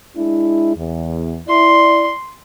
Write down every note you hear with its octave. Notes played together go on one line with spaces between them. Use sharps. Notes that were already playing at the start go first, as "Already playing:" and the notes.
G#3 D4 E4
E2
E4 D5 C6